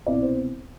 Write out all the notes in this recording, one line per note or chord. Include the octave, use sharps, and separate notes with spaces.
C2 B2 B3 E4 D5
C5